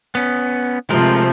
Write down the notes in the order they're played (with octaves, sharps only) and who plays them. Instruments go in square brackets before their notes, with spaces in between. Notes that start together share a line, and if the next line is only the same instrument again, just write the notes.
[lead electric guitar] B3 C#4
[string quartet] C3 F3 A3 [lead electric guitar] G#3 A#4